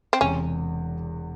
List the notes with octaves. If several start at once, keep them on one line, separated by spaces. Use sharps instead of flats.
C4
E1 E2 C3 C#4